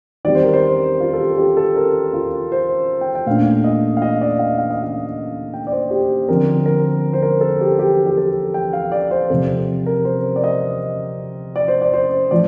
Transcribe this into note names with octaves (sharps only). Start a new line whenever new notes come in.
D#3 G3 C4 D5
C5
A#4
C5
F4
A4
G4
G4
A4
A#4
F4
C5
G5
G5
A#2 A3 D4 F5
D#5
F5
D#5
D5
F5
F5
D#5
F5
G5
D5
C5
G4
D3 F3 C4 A#4
A#4
C5
A#4
A4
G4
G4
G4
A4
G5
F5
D5
C5
C3 F3 C4 A4
A#4
C5
D5
D#5
D5
C5
D5
C5
A2 F3 D5